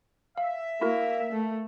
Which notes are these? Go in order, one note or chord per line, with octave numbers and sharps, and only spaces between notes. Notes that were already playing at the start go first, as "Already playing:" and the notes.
E5 F5
A#3 E4 F#4 A#4
A3